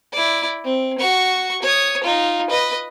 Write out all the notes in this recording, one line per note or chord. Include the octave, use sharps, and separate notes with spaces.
E4 D5
C4
F#4 C#6
C#5 D#6
D#4 F4
B4 D#5